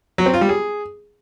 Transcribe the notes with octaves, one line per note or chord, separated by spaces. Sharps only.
F#3
C4
F4
G3
G#4